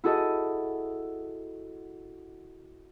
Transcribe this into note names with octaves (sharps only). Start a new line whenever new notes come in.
E4 F#4 G#4 A4 D#5